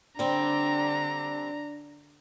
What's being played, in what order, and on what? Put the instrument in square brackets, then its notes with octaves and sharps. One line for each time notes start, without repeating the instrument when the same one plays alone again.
[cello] D3 [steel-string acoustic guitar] G3 C4 [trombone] D4 [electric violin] A#5